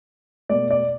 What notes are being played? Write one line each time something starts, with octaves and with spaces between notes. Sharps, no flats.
B2 A3 D5
D5